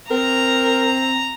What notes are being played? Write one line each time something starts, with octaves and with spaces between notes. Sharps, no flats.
C4 A#4 A#5